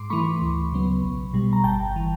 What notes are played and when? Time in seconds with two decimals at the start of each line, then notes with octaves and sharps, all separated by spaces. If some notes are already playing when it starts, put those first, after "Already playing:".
Already playing: G#2 C6 D6
0.10 E3 A3 B5 C#6
0.41 D2
0.73 C#3 F#3 B3
1.03 B1
1.34 B2 G3
1.53 A#5
1.64 G1 G5 A5
1.96 E3